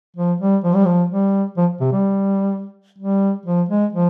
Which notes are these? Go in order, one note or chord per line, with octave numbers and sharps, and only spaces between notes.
F3
G3
F3
G3
F3
G3
F3
C3
G3
G3
F3
G#3
F3